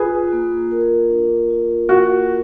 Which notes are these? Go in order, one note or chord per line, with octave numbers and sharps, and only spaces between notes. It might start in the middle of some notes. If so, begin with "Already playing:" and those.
Already playing: F4 G#4 B4
A#3
A#4
D4
F4
A#3 F#4